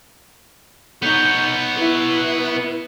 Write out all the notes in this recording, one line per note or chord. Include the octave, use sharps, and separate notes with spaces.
B3 D#4 C#5 G6
E4 B4